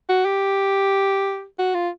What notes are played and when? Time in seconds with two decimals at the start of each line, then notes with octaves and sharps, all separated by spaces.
0.09 F#4
0.26 G4
1.59 F#4
1.74 F4